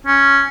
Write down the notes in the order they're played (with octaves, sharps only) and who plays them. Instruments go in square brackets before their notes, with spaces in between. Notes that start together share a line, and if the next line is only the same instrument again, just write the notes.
[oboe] C#4